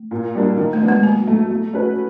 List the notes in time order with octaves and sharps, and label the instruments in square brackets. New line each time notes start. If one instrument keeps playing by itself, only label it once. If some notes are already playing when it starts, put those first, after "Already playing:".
Already playing: [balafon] A3
[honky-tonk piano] A#2
G3 A#3 D4
D#3
[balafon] A3
[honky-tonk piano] F#3 B3 D4 F#4
[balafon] G#3
[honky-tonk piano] B2 [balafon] A#3
[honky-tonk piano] F#3 A3
A3
C#4 F#4 B4